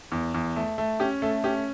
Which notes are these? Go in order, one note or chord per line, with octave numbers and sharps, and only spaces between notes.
E2
E2
A3
A3
C#4 G4
A3 A4
C#4 G4